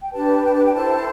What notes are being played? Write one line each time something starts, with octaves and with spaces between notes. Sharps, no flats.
G5
D4 G4 B4 A5
G5
A5
G5
E4 A4 C5 A5